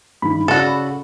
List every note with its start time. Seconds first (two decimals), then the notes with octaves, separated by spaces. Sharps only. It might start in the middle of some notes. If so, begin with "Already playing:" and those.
0.22 G2 D#3 G3 B5
0.48 C#3 F#4 A4 D5